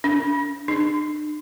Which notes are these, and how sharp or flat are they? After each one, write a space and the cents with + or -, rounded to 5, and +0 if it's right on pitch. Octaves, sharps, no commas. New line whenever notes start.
D4 -40
D4 +45